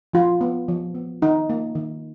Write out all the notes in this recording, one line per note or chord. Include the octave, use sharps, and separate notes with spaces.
F3 F4
B3
F3
B3
D#3 D#4
A#3
D#3